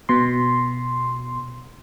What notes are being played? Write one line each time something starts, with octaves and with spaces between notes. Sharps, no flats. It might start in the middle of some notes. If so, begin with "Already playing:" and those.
B2 C6